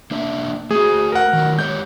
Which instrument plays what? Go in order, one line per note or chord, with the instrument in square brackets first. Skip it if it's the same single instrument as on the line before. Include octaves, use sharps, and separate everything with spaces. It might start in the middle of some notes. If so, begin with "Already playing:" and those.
[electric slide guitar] A#3 D4 E5
[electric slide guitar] A3 F#4 [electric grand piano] G#4
[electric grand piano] A#4 F#5
[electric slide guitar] D#3 F#3
[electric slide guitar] G#3 G4 C#5 [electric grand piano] G6